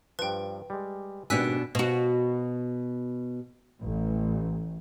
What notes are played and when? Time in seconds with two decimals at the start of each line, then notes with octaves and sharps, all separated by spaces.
0.19 G2 F3 B4 G5
0.70 G3 G#3
1.30 G#1 B2 G3 D4 G#5 E6 F#6 B6
1.75 B2 F#4
3.82 A1